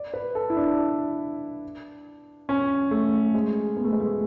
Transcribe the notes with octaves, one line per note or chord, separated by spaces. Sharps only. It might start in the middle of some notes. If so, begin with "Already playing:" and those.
Already playing: D5
B4
A4
E4
D4
C#4
A3
G#3
B3
A3
G#3
A3